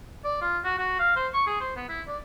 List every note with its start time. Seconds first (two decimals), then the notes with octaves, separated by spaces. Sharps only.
0.24 D5
0.42 F4
0.64 F#4
0.78 F#4
0.99 F5
1.16 C5
1.34 C#6
1.47 G#4
1.61 C5
1.76 B3
1.89 E4
2.08 D5